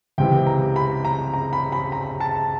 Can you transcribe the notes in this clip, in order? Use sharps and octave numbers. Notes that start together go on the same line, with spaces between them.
C#2 C3 E3 G5
A#5
B5
A#5
A#5
B5
B5
A#5
A5